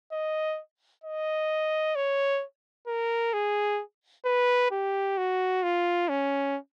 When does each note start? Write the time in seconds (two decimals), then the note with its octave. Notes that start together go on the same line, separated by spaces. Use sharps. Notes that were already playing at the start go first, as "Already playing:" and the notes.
0.12 D#5
1.04 D#5
1.95 C#5
2.87 A#4
3.33 G#4
4.26 B4
4.71 G4
5.18 F#4
5.63 F4
6.09 C#4